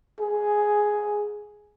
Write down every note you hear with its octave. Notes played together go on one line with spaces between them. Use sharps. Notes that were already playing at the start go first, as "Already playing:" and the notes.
G#4